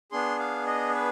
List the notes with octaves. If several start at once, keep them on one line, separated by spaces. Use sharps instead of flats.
B3 D4 G#4 C6
F5
D#5
B4